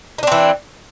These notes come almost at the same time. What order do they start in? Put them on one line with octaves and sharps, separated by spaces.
D#4 D4 C4 E3